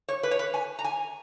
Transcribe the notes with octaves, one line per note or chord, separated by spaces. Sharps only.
C#5
B4
C#5
B4
G#5
A#5
G#5